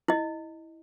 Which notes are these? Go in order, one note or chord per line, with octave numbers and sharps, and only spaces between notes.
E4 D#5